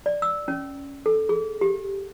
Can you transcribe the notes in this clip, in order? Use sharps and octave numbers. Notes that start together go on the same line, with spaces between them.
D5
E6
C#4
A4
G#4
G4